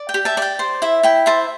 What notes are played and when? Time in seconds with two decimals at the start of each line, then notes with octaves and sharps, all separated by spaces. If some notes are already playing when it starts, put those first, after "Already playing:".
Already playing: D5
0.09 G5
0.14 G4
0.25 E5 A5
0.37 D5 G5
0.59 C5
0.82 E4 E5
1.03 E4 G5
1.26 C5 E5 A5